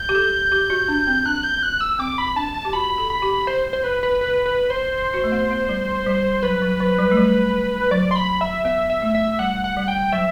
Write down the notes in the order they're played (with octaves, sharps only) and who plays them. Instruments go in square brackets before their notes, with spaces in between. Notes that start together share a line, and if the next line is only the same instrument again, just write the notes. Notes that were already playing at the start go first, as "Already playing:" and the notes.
Already playing: [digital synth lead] G6
[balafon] G4
A4
G4
F#4
D4
C4
[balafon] D4 [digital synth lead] F#6
[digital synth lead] G6
F#6
E6
[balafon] C4 [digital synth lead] D6
[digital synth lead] B5
[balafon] D4 [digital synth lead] A5
[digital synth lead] A5
[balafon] G4
[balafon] F#4 [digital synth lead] B5
[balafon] A4
[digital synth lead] B5
[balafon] G4
[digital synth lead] C5
C5
B4
B4
B4
B4
C5
[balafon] F#4
A3
B3
B3
G3
G3
[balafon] F#3 [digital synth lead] B4
[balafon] F#3
F#3
G3
A3
G3
[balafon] F#3 [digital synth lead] D5
[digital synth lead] C6
B5
E5
[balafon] B3 [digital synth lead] E5
[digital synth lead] E5
[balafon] A3
[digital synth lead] E5
[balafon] G3 [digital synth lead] F#5
[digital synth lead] F#5
[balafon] G3
[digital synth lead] G5
[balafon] F#3 [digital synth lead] E5